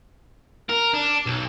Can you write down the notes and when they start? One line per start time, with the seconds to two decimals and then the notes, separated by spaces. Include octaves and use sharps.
0.69 A#4
0.94 D4
1.26 B1